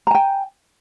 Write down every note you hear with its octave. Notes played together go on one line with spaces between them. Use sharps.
G5 G#5 A#5